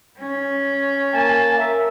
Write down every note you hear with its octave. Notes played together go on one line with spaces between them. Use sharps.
C#4
A#3 G#5 A5
A#4 E5